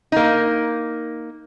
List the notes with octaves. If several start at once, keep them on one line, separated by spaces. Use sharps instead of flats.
A#3 D#4